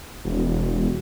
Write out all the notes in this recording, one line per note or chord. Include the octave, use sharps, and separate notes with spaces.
E1